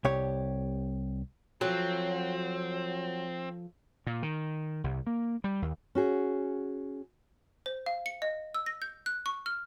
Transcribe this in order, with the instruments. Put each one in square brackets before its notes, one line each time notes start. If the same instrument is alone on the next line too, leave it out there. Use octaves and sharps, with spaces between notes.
[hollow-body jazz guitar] C2 G4 C#5
[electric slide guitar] F3 F4 A4 [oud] F#3 [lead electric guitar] C4
[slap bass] A#2
D#3
C2
A#3
G3
D#2
[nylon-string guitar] C#4 F#4 G#4
[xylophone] C5
F5
C#7
D#5
E6
A#6
G6
F#6
C#6
F6